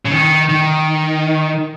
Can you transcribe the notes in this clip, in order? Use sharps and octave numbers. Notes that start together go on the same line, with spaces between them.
C#3
D#3
D#3